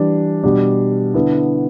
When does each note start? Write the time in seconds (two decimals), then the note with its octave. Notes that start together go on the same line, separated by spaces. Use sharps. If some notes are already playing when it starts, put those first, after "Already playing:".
Already playing: E3 G3 D4
0.43 B2 G3 D4
1.14 D3 B3 E4